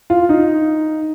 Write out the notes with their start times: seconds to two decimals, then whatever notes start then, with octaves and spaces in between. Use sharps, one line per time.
0.10 F4
0.29 D#4